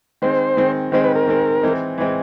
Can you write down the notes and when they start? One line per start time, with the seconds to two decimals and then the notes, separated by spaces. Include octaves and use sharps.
0.22 D#3 G#3 C4 C5
0.57 D#3 G#3 C4
0.92 D#3 G#3 C4 C5
1.04 B4
1.16 A#4
1.27 D#3 G#3 C4
1.63 E3 G#3 C4
1.98 E3 G#3 C4